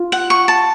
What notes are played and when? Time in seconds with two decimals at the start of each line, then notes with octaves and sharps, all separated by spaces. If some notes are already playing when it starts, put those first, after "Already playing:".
Already playing: F4
0.12 F#5
0.30 C#6
0.48 A5